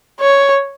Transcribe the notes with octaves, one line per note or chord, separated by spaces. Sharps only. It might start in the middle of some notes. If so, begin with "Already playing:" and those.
C#5